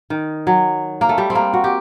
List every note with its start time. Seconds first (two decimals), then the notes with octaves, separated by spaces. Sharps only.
0.10 D#3
0.47 F#3
1.01 A#3
1.09 A3
1.18 G3
1.30 C4
1.35 A#3
1.53 F#4
1.64 G4